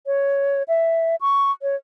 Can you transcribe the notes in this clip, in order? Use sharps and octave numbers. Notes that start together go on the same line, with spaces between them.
C#5
E5
C#6
C#5